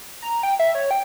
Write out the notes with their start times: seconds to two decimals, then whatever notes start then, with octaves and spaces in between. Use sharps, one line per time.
0.22 A#5
0.43 G5
0.60 E5
0.75 C#5
0.91 G5